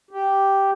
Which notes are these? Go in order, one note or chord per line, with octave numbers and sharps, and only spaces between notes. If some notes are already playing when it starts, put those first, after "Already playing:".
G4